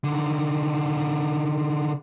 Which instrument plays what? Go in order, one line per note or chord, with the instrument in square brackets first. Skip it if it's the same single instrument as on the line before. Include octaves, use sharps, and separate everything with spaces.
[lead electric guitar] D3 D#3